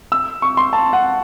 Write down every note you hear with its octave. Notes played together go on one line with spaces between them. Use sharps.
E6
C#6
C6
A5
F#5